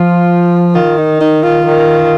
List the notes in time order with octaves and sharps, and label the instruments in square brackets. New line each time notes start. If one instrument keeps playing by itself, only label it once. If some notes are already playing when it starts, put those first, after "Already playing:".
Already playing: [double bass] F3 [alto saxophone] F4
[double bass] D#3 [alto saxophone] F4
[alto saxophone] D#4
D#4
F4
[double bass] D#3